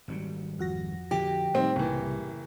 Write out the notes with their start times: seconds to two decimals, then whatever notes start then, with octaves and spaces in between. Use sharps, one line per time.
0.08 G#1 F#3 G3
0.59 F2 F#4 A#6
1.11 D3 F3 G4
1.54 A2 D#3 G3 C4
1.76 F#1 C2 E3